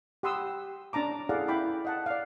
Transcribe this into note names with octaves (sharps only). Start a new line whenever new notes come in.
G4 F#5 B5 C6 D#6 E6
C#4 D4 A5 A#5 D6
E4 G#4 A4 D5 F5 F#5
E4 G5 B5 D6
D#5 F#5 A5
D5 F5